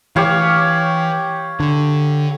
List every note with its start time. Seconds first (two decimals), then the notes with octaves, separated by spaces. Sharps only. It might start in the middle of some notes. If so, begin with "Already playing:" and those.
0.16 E3 G4 C#5 F5
1.60 D3